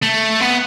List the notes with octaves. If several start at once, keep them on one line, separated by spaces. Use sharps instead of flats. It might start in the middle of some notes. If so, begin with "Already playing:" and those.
A3
B3